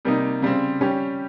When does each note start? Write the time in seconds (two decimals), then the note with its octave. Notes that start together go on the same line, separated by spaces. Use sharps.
0.05 C3 G3 A#3 D#4
0.42 C#3 G3 C4
0.81 G3 C#4 G4